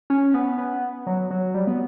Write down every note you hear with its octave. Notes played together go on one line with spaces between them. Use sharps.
C#4
B3
B3
F#3
F#3
G3
B3